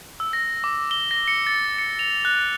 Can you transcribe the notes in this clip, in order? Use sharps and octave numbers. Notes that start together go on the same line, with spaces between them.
E6
A#6
D6
G7
A#6
C#7
A6
C#7
F7
F#6